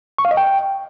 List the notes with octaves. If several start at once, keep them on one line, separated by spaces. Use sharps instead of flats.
C#6
F5
D#5
G5